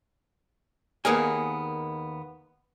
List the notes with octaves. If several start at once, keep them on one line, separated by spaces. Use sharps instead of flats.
D#2 A#3 B3 G#4 A#4 G#5